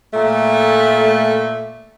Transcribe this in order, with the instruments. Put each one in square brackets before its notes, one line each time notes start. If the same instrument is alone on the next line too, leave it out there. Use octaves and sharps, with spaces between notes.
[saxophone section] A#2 A3